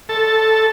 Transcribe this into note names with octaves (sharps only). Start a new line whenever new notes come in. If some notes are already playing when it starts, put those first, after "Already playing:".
A4